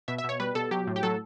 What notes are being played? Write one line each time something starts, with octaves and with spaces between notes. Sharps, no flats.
B2 E5
E5
B2 C#5
G3 B4
B2 A4
F#3 G4
A2
G4
F#3 A4